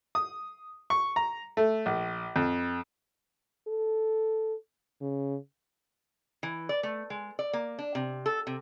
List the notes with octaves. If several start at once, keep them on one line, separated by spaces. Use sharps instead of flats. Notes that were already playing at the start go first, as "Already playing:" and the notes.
D#6
C#6
A#5
A3
A#1
F2
A4
C#3
E3
D5
A3
G#3
D5
A#3
D4
C3
A4
C3